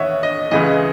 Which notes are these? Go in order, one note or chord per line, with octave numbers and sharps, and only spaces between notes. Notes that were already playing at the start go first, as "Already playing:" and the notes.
Already playing: D#2 E3 C#5 D#5 E5 F#5
D#5
C#2 C#3 E3 D#5